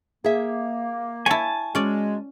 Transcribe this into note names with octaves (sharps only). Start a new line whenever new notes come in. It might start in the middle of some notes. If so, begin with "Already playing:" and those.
A#3 G#4 E5
E4 C#5 G#5 A5
G#3 C#4 F#4 D5